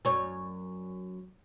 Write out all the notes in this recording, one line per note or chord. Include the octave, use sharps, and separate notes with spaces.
F#2 C#5